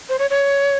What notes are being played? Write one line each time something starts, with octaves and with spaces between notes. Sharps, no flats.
C5
C#5
C#5